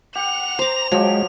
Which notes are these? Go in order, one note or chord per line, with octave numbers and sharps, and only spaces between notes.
G4 F#5 F7
C5 A#5 D6
F3 F#3 G#3 G4